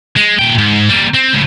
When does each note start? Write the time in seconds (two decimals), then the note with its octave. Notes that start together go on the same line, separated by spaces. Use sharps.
0.16 G#3
0.39 A#2 G5
0.58 G#2
0.89 G3 A#3
1.14 C4
1.33 C#2 A2